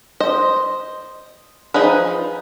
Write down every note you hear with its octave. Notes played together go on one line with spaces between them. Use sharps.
C5 D#5
F3 D#4 G#4 B4